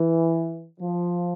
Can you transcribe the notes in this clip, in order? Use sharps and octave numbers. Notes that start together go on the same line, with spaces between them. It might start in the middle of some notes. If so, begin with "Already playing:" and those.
Already playing: E3
F3